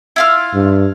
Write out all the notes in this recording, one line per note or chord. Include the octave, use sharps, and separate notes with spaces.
E4 F4 F6
G2